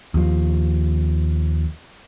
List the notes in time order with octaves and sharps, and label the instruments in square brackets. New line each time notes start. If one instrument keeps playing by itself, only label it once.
[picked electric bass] D#2 F3